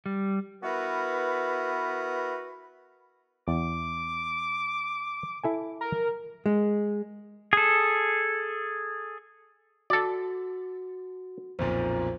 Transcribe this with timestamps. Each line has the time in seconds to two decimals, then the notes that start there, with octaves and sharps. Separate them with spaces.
0.06 G3
0.63 B3 E4 F#4 A#4 B4
3.48 E2 D6
5.44 E4 A4 G#5
5.81 A#4
6.46 G#3
7.53 G#4 A4
9.90 F#4 A4 D5
11.59 B1 F2 A#2 C5